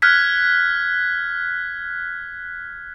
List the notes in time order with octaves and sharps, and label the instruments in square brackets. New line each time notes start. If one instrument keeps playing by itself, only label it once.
[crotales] F6 F#6 G#6 B6